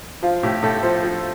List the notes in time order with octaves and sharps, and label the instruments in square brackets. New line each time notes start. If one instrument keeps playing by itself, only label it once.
[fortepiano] F3 F4
A2 G4
A2 A4
F3 C5
F3